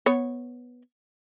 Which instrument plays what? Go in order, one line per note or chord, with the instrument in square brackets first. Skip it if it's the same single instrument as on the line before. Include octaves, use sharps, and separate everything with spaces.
[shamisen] B3 C#5